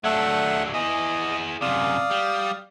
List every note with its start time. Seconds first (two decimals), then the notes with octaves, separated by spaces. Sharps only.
0.04 F#3 A3 D4 E5 F#5
0.74 E4 G#4 D#5
1.61 F#2 C3 D5 F5 D#6
2.10 G3